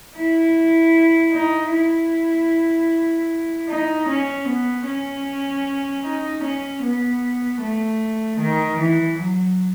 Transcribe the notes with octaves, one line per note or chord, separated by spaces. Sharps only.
E4
D#4
E4
D#4
C#4
B3
C#4
D#4
C#4
B3
A3
D#3
E3
F#3